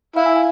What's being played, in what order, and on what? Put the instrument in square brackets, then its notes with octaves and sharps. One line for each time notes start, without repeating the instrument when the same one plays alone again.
[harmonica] E4 [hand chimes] F5
[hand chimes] G#5
G#5